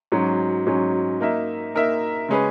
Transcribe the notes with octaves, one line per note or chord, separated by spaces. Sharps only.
G#2 F#3 C#4
G#2 F#3 C#4
A#3 D#4 A#4 E5
A#3 D#4 A#4 E5
C#3 G#3 C#4 G#4 B4